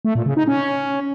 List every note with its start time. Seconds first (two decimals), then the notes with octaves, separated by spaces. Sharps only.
0.05 A3
0.15 A#2
0.26 C#3
0.37 D#4
0.47 C#4